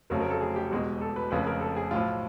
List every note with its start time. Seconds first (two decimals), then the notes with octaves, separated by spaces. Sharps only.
0.10 F1 F2 C#3 F#3 A3 A#4
0.21 A#4
0.30 A4
0.41 G#4
0.56 G4
0.71 E1 E2 B2 G#3
1.01 A4
1.16 B4
1.31 F1 F2 C#3 F3 B4
1.47 A#4
1.61 A4
1.76 G#4
1.91 B1 A2 F3 F4